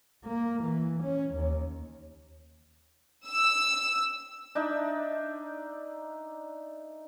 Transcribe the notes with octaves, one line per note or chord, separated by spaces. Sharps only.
A#3
E3
C#4
D#2
E6
D4 D#4 E5